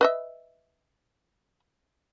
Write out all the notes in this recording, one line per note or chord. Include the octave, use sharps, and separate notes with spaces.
B4 D#5 E5